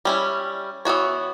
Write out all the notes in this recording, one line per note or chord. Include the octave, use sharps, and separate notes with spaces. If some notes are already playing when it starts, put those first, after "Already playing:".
G3 C#4 E4
E3 B3 F#4 C#5